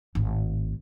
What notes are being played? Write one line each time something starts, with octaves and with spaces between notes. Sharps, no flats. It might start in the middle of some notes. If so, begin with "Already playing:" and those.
G#1 A2